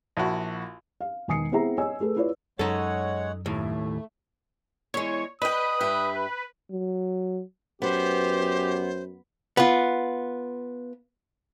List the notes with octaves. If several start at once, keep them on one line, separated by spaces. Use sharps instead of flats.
A#1 E4 F#4
F5
E1 D#3 G#5 D#6 C7 C#7
B3 C4 E4 G#4 E5 A#5
C#5 D#5 G#5 E6
A3 G#4 A4 B4
E4 F4 B4 C#5 D5
F#2 G#3 D#4 A4 C#5 F#5
D#2 A2 A3
E2 G#3 C#5
B4 D#5 G5 D#6
G2 G4 E5
F#3
F#2 B3 G4 C5
B3 F4